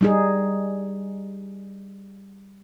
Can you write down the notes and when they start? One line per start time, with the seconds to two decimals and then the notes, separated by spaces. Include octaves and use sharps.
0.01 G3 D#4 G#4